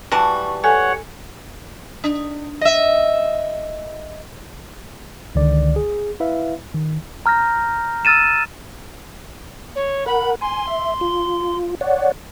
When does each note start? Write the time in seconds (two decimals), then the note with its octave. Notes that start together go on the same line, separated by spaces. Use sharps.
0.12 E3 G3 F#4 A5
0.64 A4 C#5 F#5 G#5
2.04 D4
2.61 D#5 E5
5.35 C#2 D3 D#3 D5
5.76 G#4
6.20 E4 B4 E5 F5
6.74 D#3
7.26 A#5 F6 G6 A#6
8.05 E6 F6 A6 D#7 E7
9.75 C#5
10.06 A#4 F#5 B5
10.41 G#5 C6
10.67 E5
11.01 F4
11.81 C#5 D5 F#5